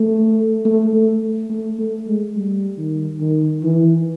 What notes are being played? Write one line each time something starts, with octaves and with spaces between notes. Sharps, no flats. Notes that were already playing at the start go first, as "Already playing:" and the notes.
Already playing: A3
A3
A3
A3
A3
G#3
G3
D#3
D#3
E3